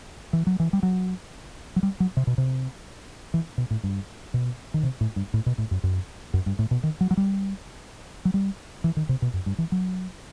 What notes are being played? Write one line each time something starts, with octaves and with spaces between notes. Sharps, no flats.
E3
F#3
E3
G3
F#3
F#3
G3
F#3
C3
B2
C3
E3
B2
A2
G2
B2
D#3
C3
A2
G2
A2
B2
A2
F#2
F#2
F#2
G2
A2
B2
D#3
F#3
F#3
G3
F#3
G3
E3
D#3
C3
B2
F#2
G2
E3
F#3